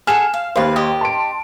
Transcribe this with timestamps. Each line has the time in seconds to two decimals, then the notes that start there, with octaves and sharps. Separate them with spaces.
0.07 G#4 A4 F#5 F6 E7
0.34 F5
0.56 D#2 B4 C5 F5
0.76 G4 D#5 D#6
1.01 A5 C6 D7